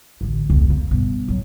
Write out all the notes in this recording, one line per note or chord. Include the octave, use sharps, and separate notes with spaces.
A1 D2
E1 C#2
F2 F3
G2 B2
A2 F#3